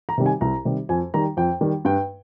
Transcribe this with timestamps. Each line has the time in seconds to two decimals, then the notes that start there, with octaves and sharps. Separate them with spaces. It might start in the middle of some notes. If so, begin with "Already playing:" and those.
0.09 A#5
0.18 C3 D#3 G3
0.26 G#5
0.41 C2 A#5
0.65 C3 D#3 G3
0.89 F2 G#5
1.14 D#3 G3 A#5
1.37 F2 G5
1.61 D#3 G3
1.85 G2 G5